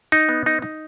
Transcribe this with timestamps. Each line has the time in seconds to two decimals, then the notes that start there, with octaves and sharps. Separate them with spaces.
0.12 D#4
0.29 B3
0.46 D#4
0.62 D#4